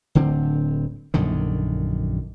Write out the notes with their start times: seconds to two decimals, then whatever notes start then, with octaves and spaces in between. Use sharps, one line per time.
0.15 D1 D3 C4
1.14 A#1 F#2 D3 D#3